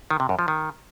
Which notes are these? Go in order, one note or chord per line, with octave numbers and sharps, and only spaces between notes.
D#3
C3
F#2
F3
D#3